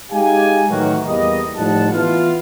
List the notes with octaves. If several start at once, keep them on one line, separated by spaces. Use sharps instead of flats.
G#3 D#4 G4 F5 G#5
A2 D#3 E3 F#3 A#3 F#4
E2 G3 A#3 D#5
A2 F3 G3 D#4 F#5 A5
E3 B3 E4 F4